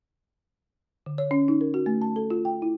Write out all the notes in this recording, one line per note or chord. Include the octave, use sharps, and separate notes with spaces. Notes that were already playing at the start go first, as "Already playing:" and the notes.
D3
C#5
C#4
D#4
A#4
F#4
A3
A5
A4
F4
G5
E4